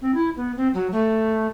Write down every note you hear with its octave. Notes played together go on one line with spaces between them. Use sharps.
C4
E4
B3
C4
F#3
A3